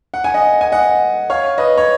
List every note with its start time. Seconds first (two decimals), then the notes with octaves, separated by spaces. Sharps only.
0.14 F#5
0.24 G#5
0.34 D#5 F#5
0.61 G#5
0.72 D#5 F#5
1.30 C#5 F5
1.58 B4 D#5
1.78 C#5